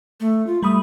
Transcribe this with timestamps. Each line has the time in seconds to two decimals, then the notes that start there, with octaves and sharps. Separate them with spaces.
0.20 A3
0.47 F4
0.63 G3 A3 B5 D#6